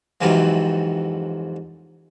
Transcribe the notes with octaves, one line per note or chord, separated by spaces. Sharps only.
F2 G#2 C3 E3 F#3 A#3